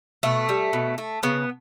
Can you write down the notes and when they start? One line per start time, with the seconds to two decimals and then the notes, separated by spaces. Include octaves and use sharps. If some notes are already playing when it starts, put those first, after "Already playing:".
0.23 B2 A3
0.49 G3
0.73 B2
0.98 A3
1.23 C#3 B3